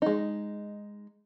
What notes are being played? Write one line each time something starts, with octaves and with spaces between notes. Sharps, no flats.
G#3 D#4